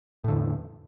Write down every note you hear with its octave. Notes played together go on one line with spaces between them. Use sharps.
E2 A2 D3